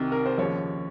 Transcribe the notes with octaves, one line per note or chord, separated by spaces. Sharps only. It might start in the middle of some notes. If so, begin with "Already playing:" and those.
Already playing: C2 C3 D#3
A#4
C5
D#2 C#3 F3 C#5